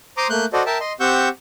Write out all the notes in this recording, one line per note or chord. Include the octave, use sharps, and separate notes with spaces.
C5 A#5 C6 D6 D#6
A3 A#3 F#6 G6
F#4 A4 C5 D5 D#5
A#4 E5 G5 A5
D#5 C6
C4 G4 F#5 C#6 E6 G6